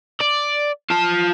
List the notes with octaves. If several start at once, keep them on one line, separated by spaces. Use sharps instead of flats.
D5
F4 A5